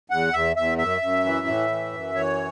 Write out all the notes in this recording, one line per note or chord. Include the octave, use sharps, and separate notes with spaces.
E2 F#5
E2 E5
E2 E5
F#2 E5
F#2
E3
A2
E3
F#2
E3 C#5